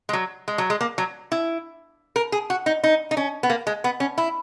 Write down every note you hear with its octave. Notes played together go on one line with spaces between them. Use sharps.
G#3
F#3
G#3
F#3
G#3
A#3
F#3
E4
A#4
G#4
F#4
D#4
D#4
D#4
C#4
B3
A#3
G#3
B3
C#4
E4